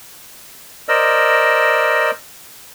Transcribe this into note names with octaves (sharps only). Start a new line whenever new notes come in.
A#4 C5 D5 D#5 E6